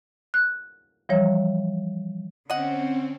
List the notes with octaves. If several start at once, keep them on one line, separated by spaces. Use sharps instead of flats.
F#6
E3 F3 G3 C#5
D3 C4 C#4 D#5 F#5